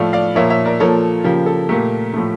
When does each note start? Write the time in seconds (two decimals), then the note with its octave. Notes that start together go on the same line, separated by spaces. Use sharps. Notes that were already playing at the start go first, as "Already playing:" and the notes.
Already playing: A2 F3 A3 D5 F5
0.13 D5 F5
0.35 A#2 F3 A#3 C#5 E5
0.50 C#5 E5
0.65 A#4 D5
0.80 A#2 F3 A#3 A4 C#5
1.24 C#3 F3 A#3 G4
1.46 A4
1.69 A#2 A3 G4 A#4
2.14 A2 F3 A3